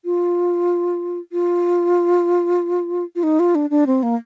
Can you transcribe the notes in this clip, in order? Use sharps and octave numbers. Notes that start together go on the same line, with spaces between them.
F4
F4
F4
D#4
F4
D4
D4
C4
A#3